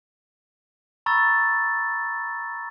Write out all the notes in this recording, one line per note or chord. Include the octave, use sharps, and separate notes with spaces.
A#5 B5 C#6 E6 A6